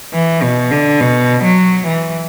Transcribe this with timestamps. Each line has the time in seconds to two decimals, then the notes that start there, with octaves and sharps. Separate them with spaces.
0.13 E3
0.42 B2
0.71 D3
1.00 B2
1.44 F#3
1.87 E3